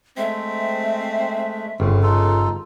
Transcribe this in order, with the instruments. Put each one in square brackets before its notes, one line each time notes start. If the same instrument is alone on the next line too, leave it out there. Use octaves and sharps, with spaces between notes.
[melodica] G#3 A3 [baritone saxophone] C4 [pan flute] E5
[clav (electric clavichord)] G1 [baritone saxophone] C#3 [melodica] C4
[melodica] D#4 F4 A4